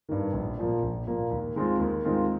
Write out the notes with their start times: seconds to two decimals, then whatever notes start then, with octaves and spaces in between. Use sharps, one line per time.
0.09 G2 D#3
0.33 A#1
0.58 A#2 F3 A#3
0.82 A#1
1.07 A#2 F3 A#3
1.31 D#2
1.55 D#3 G#3 C4 F4
1.80 D#2
2.05 D#3 G#3 C4 F4